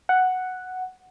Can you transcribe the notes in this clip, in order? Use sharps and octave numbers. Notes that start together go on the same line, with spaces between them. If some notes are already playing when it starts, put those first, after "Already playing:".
F#5